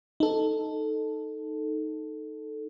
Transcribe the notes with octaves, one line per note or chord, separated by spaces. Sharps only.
D#4 A4